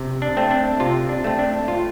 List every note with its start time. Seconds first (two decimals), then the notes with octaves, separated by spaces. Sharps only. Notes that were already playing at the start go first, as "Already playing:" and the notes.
Already playing: C3
0.22 D4
0.37 A3 C4
0.51 D4
0.80 C3 F4
1.09 D4
1.24 A3 C4
1.39 D4
1.68 A2 F4